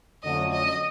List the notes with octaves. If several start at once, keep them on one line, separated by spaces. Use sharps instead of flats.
F2 D3 F#3 A3 C#4 D#5
D#5